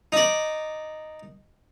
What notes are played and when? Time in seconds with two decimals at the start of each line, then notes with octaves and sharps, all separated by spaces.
0.12 D#4 D5